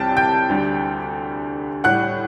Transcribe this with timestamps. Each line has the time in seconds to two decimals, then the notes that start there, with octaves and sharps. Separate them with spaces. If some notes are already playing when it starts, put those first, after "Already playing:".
Already playing: C2 C3 E3 G3 G5 A5 A6
0.17 G5 G6
0.49 D2 D3 G3
1.84 A2 G3 F#5 F#6